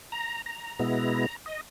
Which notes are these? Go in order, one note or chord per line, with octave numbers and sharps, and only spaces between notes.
A#5
A#5
B2 G#3 B3 E4
D#5